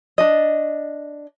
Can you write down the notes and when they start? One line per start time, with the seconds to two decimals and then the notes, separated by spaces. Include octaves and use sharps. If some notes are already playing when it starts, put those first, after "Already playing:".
0.18 D4 D#5